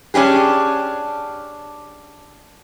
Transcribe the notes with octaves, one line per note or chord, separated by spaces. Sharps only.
C#4 D4 G4 G#4